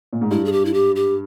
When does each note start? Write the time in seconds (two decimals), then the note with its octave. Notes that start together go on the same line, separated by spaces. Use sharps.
0.13 A#2
0.21 G#2
0.31 G2 E4
0.45 G#4
0.52 G4
0.65 E4
0.74 G4
0.96 G4